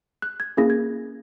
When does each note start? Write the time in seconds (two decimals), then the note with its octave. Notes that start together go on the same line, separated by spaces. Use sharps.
0.22 F#6
0.40 G#6
0.57 A#3 C#4 E4 G#4 A#6
0.70 G#6